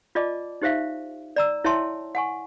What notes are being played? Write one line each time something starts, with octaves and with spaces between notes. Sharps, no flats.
F4 D5 D#5 A5 D6
D#4 G4 C5 E5 F5
D5 A#5 E6
E4 C#5 E5 G5 A5 C6
F#5 G#5 C#6